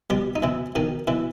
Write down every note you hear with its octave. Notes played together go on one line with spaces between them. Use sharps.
B2 G3 G4
D#4
B2 E3 E4
B2 D#3 D#4
B2 E3 E4